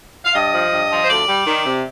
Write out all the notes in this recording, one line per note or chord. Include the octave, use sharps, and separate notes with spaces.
F5
G2 D#5
F3
G2
F3
C5
D2 D5
G3
D#3
C3